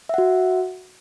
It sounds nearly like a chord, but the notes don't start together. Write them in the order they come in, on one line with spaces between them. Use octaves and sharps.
E5 F#5 F#4